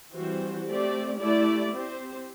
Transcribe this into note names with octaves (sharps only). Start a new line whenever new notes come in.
E3 G3 C4 F#4 C5
A3 C4 G4 D5
A3 E4 G4 D5
C4 G4 C5